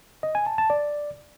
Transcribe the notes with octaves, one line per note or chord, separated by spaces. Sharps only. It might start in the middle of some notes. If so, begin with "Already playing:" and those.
D#5
G#5
A5
A5
D5